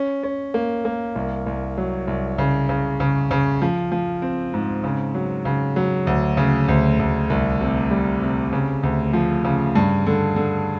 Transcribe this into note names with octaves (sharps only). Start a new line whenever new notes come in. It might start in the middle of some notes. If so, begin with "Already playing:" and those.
Already playing: C#4
C#4
A#3
A#3
C2
C2
F#3
C2
C#3
C#3
C#3
C#3
F3
F3
C4
G#2
C#3
F#3
C#3
F#3
D2
C#3
D2
D2
C2
C3
G3
C3
C#3
D2
F3
C#3
G2
D3
D3